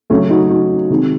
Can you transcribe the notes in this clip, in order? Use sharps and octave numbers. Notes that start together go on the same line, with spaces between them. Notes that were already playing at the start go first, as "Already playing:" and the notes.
C#3 F#3 A3 C#4
D#4 F#4
D#4 F#4
C3 D#3 G#3